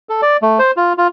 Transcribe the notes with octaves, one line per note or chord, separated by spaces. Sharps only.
A4
D5
A3
C5
F4
F4